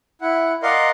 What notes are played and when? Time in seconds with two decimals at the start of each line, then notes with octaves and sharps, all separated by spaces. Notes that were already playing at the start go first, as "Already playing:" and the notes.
0.21 E4 F#5
0.63 A#4 D5 D#5 F5 F#5 C6